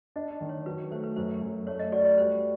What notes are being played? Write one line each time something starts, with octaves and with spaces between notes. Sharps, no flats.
D4 D#5
D#3
C#5
F#3 B4
A3 C5
B4
F#2 C5
F#2
A3 C#5
D#5
F#4 D5
D5
G3 C5